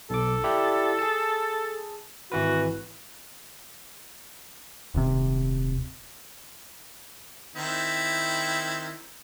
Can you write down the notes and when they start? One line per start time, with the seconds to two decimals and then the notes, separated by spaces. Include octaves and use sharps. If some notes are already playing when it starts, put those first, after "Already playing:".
0.10 B1 A4 D6
0.44 E4 G4 D5
0.99 G#4 A5
2.32 G#1 E3 F#4 B4
4.94 D#1 C3
7.56 D#3 C4 E4